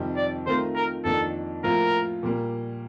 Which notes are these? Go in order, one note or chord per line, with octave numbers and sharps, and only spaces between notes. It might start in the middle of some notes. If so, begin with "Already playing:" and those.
Already playing: F2 C3 D#3 G3 C4
D5
D#3 A3 C4 F4 A#4 C5
A#4
F2 D#3 A#3 D4 A4
A2 F3 A#3 F4 A#4
A#2 G3 A#3